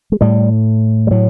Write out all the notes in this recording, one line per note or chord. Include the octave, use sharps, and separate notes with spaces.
G#3
A2 G3
G3
A2 F#3